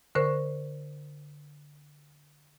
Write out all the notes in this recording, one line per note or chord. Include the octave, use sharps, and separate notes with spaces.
D3 A#4 C5 C#6